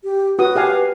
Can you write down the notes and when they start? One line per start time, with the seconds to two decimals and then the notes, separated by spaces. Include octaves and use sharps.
0.04 G4
0.39 F#4 B4 D#6
0.56 G4 F5 G#5